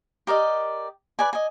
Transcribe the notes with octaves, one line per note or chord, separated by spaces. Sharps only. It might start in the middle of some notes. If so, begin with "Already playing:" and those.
G4 A#4 D5 D#5
B4 D5 G#5
D#5 G#5